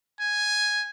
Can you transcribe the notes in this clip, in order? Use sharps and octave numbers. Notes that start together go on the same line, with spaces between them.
G#5